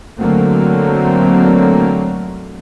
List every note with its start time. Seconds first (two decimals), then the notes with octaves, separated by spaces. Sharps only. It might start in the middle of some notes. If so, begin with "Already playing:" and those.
0.19 D3 F#3 A3 A#3 C4